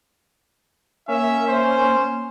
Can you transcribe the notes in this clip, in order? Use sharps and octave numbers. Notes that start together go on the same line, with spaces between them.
A#3 C#4 E5
C5